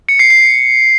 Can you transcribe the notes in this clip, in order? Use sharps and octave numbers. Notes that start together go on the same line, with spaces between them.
C#7
C7
C7